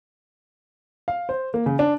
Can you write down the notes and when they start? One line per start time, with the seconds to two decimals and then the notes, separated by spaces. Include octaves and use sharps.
1.08 F5
1.29 C5
1.54 A#3
1.66 C#3
1.79 D4